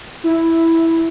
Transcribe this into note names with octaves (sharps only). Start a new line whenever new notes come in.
E4